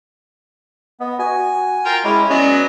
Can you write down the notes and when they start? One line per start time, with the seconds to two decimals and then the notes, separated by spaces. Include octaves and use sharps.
1.00 B3 D#5
1.19 F#4 G#5
1.85 F4 A#4 G5
2.04 G#3 C#4 E4 D6
2.30 F#3 B3 C#4 D5 D#5 G#5